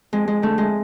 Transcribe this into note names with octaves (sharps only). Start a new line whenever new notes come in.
F2 G#3
G#3
D3 A3
G#3